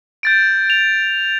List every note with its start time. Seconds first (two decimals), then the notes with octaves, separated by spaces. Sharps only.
0.23 G6 A6 D7
0.70 F7